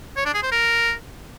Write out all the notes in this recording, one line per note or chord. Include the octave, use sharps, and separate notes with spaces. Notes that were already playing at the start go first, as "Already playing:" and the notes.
C#5
D4
G#4
C5
A#4